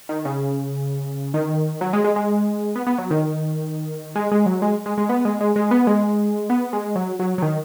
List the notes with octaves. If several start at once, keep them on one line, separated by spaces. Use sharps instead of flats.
D#3
C#3
D#3
F#3
G#3
G#3
G#3
B3
B3
F#3
D#3
G#3
G#3
F#3
G#3
G#3
G#3
B3
G#3
G#3
G#3
B3
G#3
B3
G#3
F#3
F#3
F#3
D#3